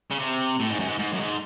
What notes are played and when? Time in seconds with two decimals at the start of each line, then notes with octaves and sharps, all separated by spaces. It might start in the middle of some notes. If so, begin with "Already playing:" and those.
0.11 C#3
0.19 C3
0.60 A2
0.70 G#2
0.79 F#2
0.88 G#2
0.99 G#2
1.13 F#2
1.20 G#2